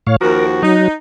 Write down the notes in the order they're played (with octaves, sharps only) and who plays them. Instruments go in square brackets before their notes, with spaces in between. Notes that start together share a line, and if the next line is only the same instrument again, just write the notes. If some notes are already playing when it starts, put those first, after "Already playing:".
[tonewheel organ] A2 C#5 F5
[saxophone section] D#2 F3 F#4 [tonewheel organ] A#4
[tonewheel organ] F#3 [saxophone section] D#4